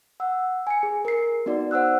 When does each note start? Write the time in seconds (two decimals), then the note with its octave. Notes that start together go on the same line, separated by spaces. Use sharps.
0.20 F#5 E6
0.67 G#5 C#7
0.83 G#4
1.05 A#4 C7
1.46 B3 D#4 F#4 D5
1.71 C5 F#5 E6 F#6